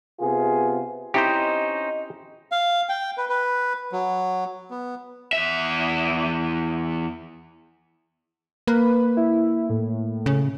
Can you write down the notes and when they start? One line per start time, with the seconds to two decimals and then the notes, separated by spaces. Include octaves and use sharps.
0.20 C3 B3 F4 G#4
1.14 C4 C#4 D#4 E4 G4 C5 D#5
2.52 F5
2.89 G5
3.17 B4
3.29 B4
3.92 F#3
4.71 B3
5.33 E2 E5
8.67 A#3 B4
9.17 E4
9.70 A2
10.26 C#3